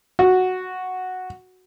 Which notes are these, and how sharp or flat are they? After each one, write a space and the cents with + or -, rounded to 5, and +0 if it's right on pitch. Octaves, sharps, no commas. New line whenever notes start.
F#4 -5